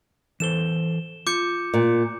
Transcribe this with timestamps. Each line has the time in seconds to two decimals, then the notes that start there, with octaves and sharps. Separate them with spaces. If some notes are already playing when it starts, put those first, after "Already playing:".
0.40 E3 A4 C5 E7 G7
1.27 F4 D6 G6 C#7
1.74 A#2